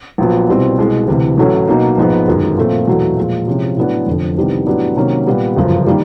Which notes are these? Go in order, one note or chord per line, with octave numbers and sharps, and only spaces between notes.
A#1 A#2 F#3 B3
C2 B2 G3 C4
C2 B2 G#3
D2 C3 E3
A1 A2 F#3 A3 C#4
B2 F#3 A#3 D#4
A#1 G#2 F3 G#3 B3
G1 F#2 D#3 G#3
A#2 F3 A3 C4
E2 B2 F#3 A3
A#2 F3 G#3
C3 F3 G#3 C#4 E4
A2 F#3 B3 D4 F#4
F1 F2 D3
C2 C3 D#3 G3 B3
A2 F#3 B3 D4 G4
C3 D#3 F#3 A#3 C#4
A#2 G3 B3
G1 F#2 C#3 F3
D#3 G3 A#3